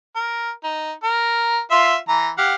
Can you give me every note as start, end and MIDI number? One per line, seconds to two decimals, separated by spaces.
0.16 0.51 70
0.63 0.92 63
1.03 1.59 70
1.71 1.95 65
1.71 1.95 76
1.71 1.95 84
2.09 2.30 52
2.09 2.30 82
2.38 2.55 67
2.38 2.55 77
2.38 2.55 78